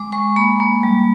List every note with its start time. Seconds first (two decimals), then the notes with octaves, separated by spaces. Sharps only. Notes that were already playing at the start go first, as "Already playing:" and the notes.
Already playing: G#3 D6
0.12 G#3 C#6
0.36 A#3 B5
0.60 A#3
0.83 G3